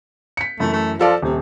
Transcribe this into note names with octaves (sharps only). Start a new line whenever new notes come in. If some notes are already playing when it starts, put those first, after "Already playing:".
B6 C#7
F#2 E3 A3
A3
F3 F4 A4 D5
D#1 C3